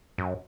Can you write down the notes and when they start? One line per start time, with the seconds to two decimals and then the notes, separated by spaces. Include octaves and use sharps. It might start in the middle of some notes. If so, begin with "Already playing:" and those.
0.18 F#2